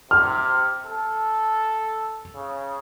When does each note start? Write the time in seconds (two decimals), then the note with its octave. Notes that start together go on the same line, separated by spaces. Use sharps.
0.11 C3 F6
0.86 A4
2.35 C#3